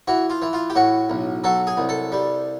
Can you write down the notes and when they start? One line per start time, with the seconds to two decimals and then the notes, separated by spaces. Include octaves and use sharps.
0.08 E3 F#4
0.30 F4
0.42 E3
0.53 F4
0.70 G4
0.75 A2 F#4
1.10 B1
1.44 F#3 A4
1.67 G#4
1.77 C2
1.89 A4
2.12 G3